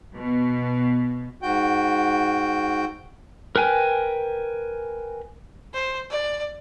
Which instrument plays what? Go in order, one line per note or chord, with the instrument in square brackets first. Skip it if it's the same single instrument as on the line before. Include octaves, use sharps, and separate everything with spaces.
[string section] B2
[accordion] G#2 F#4 G5
[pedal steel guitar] A#4 B4 G5 G#5
[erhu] C5
D5